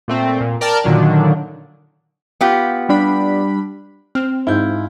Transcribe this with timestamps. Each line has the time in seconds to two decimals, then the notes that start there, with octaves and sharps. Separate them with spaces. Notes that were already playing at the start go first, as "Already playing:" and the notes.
0.08 A#2 A3 C4
0.41 A#2
0.61 A#4 D5 G5 A5 F6
0.84 A#2 D3 D#3 F#3 D4
2.41 B3 F4 G4
2.89 G3 D4 B5
4.15 C4 F6
4.47 G#2 E4 F4 G6